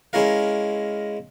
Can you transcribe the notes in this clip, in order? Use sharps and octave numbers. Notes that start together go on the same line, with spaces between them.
G#3 C#4 E4 A#4 F5